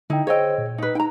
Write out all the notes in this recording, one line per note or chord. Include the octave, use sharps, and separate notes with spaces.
D3 D#4 E4 G5
G#4 C5 C#5 D#5 G5 E6
A#2
D#4 B4
D#4 G5 A#5